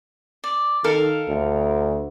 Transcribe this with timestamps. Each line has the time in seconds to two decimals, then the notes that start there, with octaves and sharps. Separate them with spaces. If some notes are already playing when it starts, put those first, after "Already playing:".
0.44 D5
0.84 D#3 A4 A#4 F5
1.28 D2